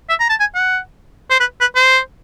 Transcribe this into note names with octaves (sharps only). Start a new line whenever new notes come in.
E5
A#5
A5
G#5
F#5
C5
B4
B4
C5